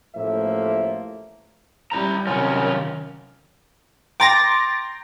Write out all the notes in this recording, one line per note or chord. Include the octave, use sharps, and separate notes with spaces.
A1 A2 F3 A#3 E5
G3 E4 A#5
F#2 C3 D#3 C#4 F4
G5 A#5 C6 D6 A6 A#6